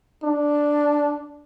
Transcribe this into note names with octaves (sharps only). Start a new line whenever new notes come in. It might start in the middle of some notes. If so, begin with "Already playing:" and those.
D4